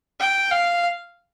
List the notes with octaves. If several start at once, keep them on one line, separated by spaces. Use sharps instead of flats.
G5
F5